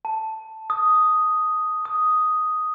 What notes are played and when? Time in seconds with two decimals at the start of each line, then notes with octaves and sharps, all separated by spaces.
0.05 A5
0.70 D#6
1.85 D#6